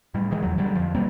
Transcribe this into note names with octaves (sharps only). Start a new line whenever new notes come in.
A2 G3
D#3 E3 G#3
E2 F#3
G#2 D3 F#3 G3
F2 F3
B2 G3 A#3 C4